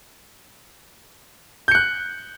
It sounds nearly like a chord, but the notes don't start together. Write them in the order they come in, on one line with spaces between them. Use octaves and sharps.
G6 C#7 F#6